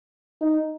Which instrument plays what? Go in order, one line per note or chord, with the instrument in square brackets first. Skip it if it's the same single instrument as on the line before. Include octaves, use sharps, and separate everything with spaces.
[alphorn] D#4